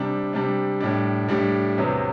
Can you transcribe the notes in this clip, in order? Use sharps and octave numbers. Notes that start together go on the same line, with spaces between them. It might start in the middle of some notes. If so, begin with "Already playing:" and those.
Already playing: C3 G3 D4
C3 G3 D4
A2 G3 D4
A2 G3 D4
E2 C3 F#3 B3